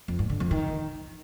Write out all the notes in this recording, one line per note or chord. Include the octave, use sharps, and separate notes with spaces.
F2
G2
D3
F2
D#3